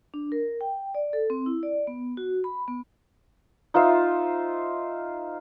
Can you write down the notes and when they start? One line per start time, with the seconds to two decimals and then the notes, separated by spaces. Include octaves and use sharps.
0.14 D4
0.32 A#4
0.61 G5
0.95 D5
1.13 A4
1.30 C4
1.46 E4
1.63 D5
1.87 B3
2.17 F#4
2.44 B5
2.68 B3
3.74 D#4 F4 C5 E5